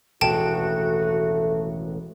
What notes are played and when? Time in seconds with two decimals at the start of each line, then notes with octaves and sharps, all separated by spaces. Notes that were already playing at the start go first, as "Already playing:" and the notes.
0.21 E1 A1 D#2 A3 F#4 G5 A5